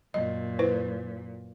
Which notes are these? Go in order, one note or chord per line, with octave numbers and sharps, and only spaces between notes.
F#2 A#2 D#5
E4 B4 C5